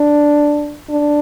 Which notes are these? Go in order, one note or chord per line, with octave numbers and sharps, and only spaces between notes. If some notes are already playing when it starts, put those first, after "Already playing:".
Already playing: D4
D4